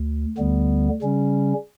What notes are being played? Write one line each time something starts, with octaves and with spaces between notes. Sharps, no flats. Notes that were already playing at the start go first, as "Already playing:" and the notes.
Already playing: D2
D2 D3 G3 B3
C#3 G3 C#4